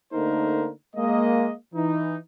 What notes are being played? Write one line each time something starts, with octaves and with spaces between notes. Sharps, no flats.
D3 A3 A#3 D#4 A#4 C5
G#3 A#3 D#5
E3 D#4